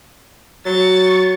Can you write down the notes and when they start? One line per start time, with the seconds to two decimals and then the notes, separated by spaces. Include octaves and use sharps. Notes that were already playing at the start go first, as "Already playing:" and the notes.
0.66 F#3 C#6 A6